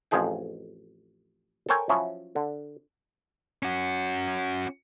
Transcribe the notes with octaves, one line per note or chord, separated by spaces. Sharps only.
A1 F2 F3 G#4 G5
A4 A#4 C5 C#5 G5 G#5
F3 F#3 C#4 E4
D3
C#4 F#4